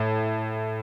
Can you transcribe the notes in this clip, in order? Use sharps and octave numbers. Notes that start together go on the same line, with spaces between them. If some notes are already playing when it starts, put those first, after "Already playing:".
Already playing: A2